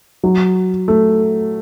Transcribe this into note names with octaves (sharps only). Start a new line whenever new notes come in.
F#3
A3